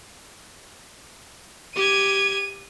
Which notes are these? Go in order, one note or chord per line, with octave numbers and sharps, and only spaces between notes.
G4 G#6 D#7